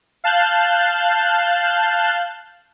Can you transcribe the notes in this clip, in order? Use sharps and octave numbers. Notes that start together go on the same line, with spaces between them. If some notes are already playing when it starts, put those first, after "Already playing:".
F5 A5 F#6 G6